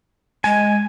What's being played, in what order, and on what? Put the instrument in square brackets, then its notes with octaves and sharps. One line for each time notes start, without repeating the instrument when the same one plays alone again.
[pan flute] G#3 [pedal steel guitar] G#5